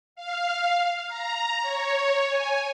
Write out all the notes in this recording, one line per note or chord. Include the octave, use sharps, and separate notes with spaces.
F5
A#5
C#5
G#5